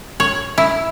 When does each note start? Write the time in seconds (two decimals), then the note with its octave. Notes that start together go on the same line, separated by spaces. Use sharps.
0.20 C#5
0.58 E4